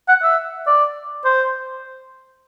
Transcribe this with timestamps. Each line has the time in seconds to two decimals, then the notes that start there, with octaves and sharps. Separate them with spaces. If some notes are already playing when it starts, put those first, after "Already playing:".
0.09 F#5
0.23 E5
0.67 D5
1.25 C5